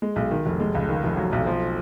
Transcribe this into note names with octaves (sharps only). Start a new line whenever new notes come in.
G#3
B1
D#3
F1
G#3
C#2
D#3
F1
F#3
B1
F3